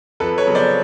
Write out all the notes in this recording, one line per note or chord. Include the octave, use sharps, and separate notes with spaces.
F2 A4 B4
B4 C#5
C#3 F#3 B3
C5 D5